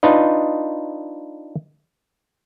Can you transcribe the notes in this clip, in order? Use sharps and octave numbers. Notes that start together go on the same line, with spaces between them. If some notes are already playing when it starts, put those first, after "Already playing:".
D4 D#4 F4 B4 D#5